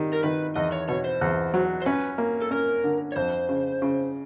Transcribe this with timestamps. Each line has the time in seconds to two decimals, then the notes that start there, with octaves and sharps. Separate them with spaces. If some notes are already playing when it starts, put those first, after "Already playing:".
Already playing: D#3 G3
0.13 A#4
0.23 D#3 B4
0.55 E2 D#5
0.72 C#5
0.88 B2 C#5
1.04 C5
1.21 E2
1.54 F#3
1.82 C5
1.86 C#4 B4
2.18 A#3
2.42 A4
2.51 C#4 A#4
2.84 D3
3.12 C#5
3.16 F2 C5
3.49 C#3
3.82 C#3